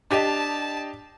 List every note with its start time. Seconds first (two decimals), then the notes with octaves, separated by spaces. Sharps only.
0.11 D4 G4 D#5 A5